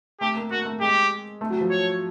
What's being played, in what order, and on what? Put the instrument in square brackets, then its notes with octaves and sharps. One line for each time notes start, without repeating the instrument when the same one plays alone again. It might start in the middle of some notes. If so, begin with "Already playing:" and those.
[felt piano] A3 [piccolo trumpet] G4
[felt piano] A#3
[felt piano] A#3 [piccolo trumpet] F#4
[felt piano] A3
[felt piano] G#3 [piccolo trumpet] G4
[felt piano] A3
F#3
F3
[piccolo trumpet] C#5